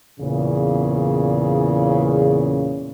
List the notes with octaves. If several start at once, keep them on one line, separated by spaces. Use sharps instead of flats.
E2 A#2 C#3